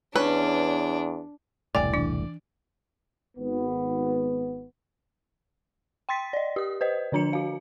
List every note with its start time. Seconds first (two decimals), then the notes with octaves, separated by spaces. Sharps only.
0.15 E2 C#4 D4 B4
1.75 E1 C2 A2 D5 G5 G#5
1.93 E3 D4
3.37 G#1 B3
6.09 G5 C6 A6 B6
6.33 D5 D#5
6.56 G4 D#6
6.81 B4 C5 D#5
7.12 D3 F3 D4 A#5 C#7
7.33 F#4 F5